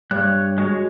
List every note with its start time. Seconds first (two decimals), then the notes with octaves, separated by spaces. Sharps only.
0.11 G2 C#5 F#6
0.58 G#3 F#4 C#5